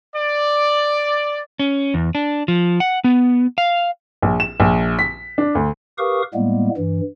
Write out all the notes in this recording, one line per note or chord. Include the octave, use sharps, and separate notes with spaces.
D5
C#4
E2
D4
F3
F#5
B3
F5
A#1
E7
A#1
B6
D4
D2
G4 A#4 B4 F5 C#6 D#6
A2 G3 G#3 A#3 B3
G2 E3